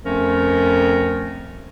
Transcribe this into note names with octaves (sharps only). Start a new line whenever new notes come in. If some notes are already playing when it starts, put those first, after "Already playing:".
F2 F3 A3 C#4 A#4